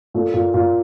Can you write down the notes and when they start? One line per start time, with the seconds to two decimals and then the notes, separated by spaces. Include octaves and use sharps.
0.14 A#2 A3
0.34 A#2
0.54 A#2